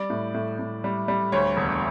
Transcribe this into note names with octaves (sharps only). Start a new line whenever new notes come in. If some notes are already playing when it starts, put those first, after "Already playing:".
Already playing: G3 D5
A2
A2
A2
G3
G3
D2 C#5
E1